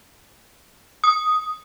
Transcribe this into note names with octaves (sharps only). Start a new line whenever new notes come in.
D#6